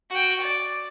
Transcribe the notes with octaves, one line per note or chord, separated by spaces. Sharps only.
F#4 G5
D5